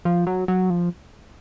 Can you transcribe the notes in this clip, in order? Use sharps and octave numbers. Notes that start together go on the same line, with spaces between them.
F3
F#3
F#3
F3